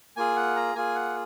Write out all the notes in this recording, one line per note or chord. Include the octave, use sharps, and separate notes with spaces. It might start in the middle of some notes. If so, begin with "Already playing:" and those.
A#3 F4 G#4 G#5
F#5
A#5
A#3 F4 G#4 G#5
F#5